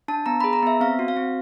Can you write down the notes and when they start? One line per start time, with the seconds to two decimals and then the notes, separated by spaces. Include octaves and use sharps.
0.08 D4 A5
0.26 B3 A#5
0.40 G#4 B5
0.53 A#5
0.63 B3 E5
0.81 C4 F5
0.99 F#4
1.08 F5
1.17 C4